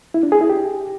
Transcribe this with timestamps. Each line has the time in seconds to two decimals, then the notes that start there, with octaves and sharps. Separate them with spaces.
0.14 E4
0.23 D4
0.32 G#4
0.41 E4
0.50 G4